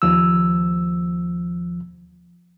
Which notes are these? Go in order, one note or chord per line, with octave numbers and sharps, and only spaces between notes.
D#2 F3 E6